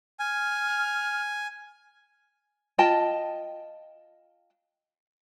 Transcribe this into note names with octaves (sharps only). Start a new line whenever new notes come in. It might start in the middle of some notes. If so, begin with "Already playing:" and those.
G#5 F6
F4 D#5 G5 A5